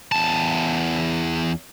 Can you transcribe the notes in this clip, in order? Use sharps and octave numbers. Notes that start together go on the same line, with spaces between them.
E2 A5